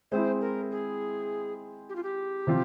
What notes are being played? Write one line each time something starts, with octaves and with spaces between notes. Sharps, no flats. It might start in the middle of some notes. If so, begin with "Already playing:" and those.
G#3 C4 E4 C5
A#4
G#4
G4
F4
G4
C3 F3 C4 F4